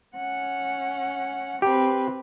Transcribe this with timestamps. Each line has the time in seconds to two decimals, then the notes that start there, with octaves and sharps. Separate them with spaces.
0.16 C#4 F#5
1.62 C4 G4 B4